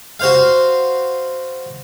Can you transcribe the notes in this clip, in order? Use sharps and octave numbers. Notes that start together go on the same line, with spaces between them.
F#4 C5 F5